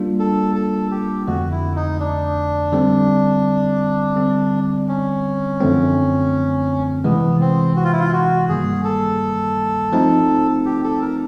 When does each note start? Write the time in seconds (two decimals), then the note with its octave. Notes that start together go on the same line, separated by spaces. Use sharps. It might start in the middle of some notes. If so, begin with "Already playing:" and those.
Already playing: G3 A#3 D4 F4
0.19 A4
0.55 A4
0.91 G4
1.27 F2 D3 F3 A3 F#4
1.51 E4
1.76 D#4
2.00 D4
2.72 D3 G3 C4
4.16 D3 G3 C4
4.88 C#4
5.60 F#2 D3 F3 A3 C4
7.04 C3 E3 G#3 B3
7.40 C4
7.76 F#4
7.84 F4
7.92 E4
8.00 F4
8.13 F#4
8.49 G2 D#3 G3 A#3 G#4
8.85 A4
9.93 F3 A3 C4 D#4
10.65 G4
10.84 A4
11.01 A#4